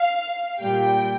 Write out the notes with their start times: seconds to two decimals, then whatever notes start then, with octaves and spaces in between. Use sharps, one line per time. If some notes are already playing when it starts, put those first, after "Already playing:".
Already playing: F5
0.60 A#2 G3 G5